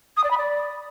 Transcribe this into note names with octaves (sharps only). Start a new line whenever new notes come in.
D#6
D5
B5
D5